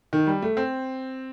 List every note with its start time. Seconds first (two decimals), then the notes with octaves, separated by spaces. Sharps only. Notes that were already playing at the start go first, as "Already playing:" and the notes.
0.13 D#3
0.27 G3
0.42 A3
0.57 C4